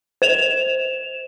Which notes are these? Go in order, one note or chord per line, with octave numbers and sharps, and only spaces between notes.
C5 E7 F7